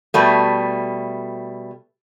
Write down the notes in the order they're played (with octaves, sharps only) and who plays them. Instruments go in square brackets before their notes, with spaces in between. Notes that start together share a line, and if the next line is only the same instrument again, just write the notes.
[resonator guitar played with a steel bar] B2 G3 A3